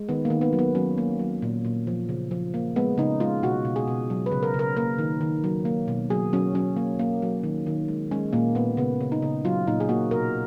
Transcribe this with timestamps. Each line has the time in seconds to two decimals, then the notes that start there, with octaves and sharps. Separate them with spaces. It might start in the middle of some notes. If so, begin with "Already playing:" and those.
Already playing: G#3
0.09 D#3 B3
0.25 A#3
0.30 D#3
0.41 B3
0.53 F#3
0.59 B3
0.75 F#3 C#4
0.98 A#3
1.19 F#3
1.42 A#2
1.65 A#2
1.87 F3
2.09 C#3
2.31 F3
2.54 A#3
2.76 G#3 B3
2.98 C#3 D#4
3.20 G#3 F4
3.43 B2 F#4
3.65 B2
3.76 G#4
3.87 B2
4.10 F#3
4.26 B4
4.32 C#3
4.43 A#4
4.54 C#3
4.59 A#4
4.77 A#3 A#4
4.99 D#3
5.21 D#3
5.44 F#3
5.65 A#3
5.88 B2
6.10 F#3 G#4
6.33 F#3 C#4
6.55 F#3 C#4
6.77 A#3
6.99 A#3
7.22 F#3
7.43 D#3
7.66 D#3
7.88 G#3
8.11 G#3 C#4
8.33 A#2 A#3
8.55 A#2 B3
8.77 C#3 B3
9.01 C#3
9.12 D#4
9.22 C#3
9.45 F#3 F4
9.67 A#2 D#4
9.80 G#4
9.89 A#3 F#4
10.11 B2 A#4